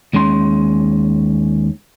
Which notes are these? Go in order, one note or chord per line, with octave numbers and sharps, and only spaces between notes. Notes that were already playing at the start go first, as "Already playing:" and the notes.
D#2 G#3 C#4 C6